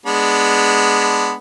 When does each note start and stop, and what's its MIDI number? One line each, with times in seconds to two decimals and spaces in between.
0.06 1.34 56
0.06 1.34 59
0.06 1.34 62